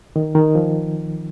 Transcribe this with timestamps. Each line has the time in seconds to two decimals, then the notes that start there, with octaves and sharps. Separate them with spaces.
0.16 D#3
0.35 D#3
0.55 F3